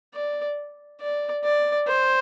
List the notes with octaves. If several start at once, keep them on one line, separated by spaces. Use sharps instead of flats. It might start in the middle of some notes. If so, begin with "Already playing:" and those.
D5
D5
D5
C5